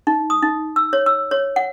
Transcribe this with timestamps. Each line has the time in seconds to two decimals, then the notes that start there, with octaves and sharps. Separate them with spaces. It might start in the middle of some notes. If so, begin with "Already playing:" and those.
0.07 D#4
0.30 D#6
0.42 D#4
0.76 E6
0.93 C#5
1.06 E6
1.31 C#5
1.56 F#5